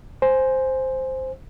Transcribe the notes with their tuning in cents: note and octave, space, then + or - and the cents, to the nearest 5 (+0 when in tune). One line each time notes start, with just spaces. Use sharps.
C5 +0 G#5 +0